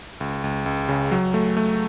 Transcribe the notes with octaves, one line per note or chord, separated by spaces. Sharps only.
C#2
C#2
C#2
C#3
F#3
A3
A3